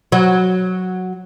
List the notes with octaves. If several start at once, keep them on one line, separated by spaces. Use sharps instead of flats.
F#3